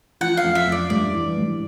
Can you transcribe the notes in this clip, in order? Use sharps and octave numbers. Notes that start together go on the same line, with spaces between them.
F3 F#5
F5
F2
E5
F2 D5
G2 D5
E3
G2